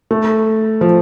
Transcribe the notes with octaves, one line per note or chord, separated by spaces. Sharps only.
A3
F3